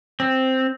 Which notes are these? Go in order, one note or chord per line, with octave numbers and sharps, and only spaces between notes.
C4